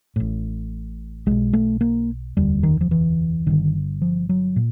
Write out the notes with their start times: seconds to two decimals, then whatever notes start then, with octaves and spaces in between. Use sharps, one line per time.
0.16 A1 A2
1.26 B1 B2 G#3
1.53 A3
1.81 A#3
2.37 F1 D#2 D3 G3
2.63 D#3
2.81 F3
2.91 E3
3.46 G1 G2 D3 D#3
4.02 F3
4.29 F#3
4.56 A#2